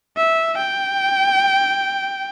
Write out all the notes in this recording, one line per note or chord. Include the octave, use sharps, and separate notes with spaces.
E5
G5